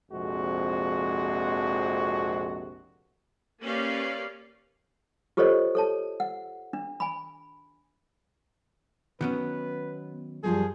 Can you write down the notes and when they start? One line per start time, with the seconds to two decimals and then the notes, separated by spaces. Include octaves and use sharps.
0.11 A#1 F2 C3 G#3 F#4
3.62 A#3 C#4 G4 B4 D5 F5
5.37 F4 G4 A4 C5 C#5 D#5
5.75 A4 C#5 A5
6.20 F#5
6.73 D4
7.00 G#5 B5
9.21 D#3 F#3 B3 C#4 B4
10.43 F#2 F3 G3 F4 G#4